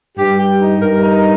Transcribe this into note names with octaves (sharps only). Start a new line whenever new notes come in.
G2 G4
G4
D#4
G2 A#4
D#4